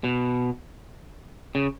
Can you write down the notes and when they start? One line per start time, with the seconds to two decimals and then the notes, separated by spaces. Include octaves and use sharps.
0.04 B2
1.55 C#3